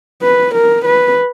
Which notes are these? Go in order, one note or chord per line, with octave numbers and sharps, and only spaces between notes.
B4
A#4
B4